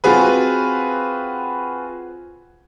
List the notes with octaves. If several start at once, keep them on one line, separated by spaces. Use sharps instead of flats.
C4 F4 F#4 G#4 B4